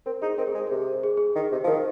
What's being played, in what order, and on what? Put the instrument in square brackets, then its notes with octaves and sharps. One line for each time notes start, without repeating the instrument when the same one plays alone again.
[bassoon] C4 [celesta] A#4
[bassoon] D#4 [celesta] G#4
[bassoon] C4 [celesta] A#4
[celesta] G#4
[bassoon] G#3
[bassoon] C3 [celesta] G#4
[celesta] G#4
G#4
[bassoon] D#3
C3
F3
[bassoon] D#3 [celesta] A#4